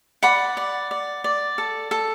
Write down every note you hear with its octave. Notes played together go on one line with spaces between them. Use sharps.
D5 F#5 B5
D5
D5
D5
A4
A4